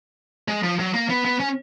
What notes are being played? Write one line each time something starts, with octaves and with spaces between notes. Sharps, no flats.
G#3
F3
F#3
A#3
B3
B3
C#4